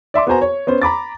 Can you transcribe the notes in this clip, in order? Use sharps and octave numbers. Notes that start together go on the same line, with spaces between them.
D5 E5 C6 D6
B3 F#4 A#4 C5 G#5 A#5
C#5
B3 C#4 C5
A#5 B5 D6 A6